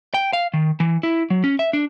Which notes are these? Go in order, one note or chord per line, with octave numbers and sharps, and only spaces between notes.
G5
F5
D#3
E3
E4
F#3
C#4
E5
D4